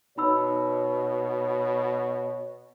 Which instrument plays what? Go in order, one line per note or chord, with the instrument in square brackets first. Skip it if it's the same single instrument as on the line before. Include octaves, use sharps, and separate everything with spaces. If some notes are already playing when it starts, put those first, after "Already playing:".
[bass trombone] B2 [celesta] D#4 B5 E6 [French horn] C#5